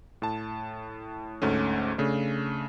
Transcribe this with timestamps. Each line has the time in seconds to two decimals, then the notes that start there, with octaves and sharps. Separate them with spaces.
0.22 A2 A5
1.42 D2 G#2 A3 C#4
1.98 C#3 A3 D4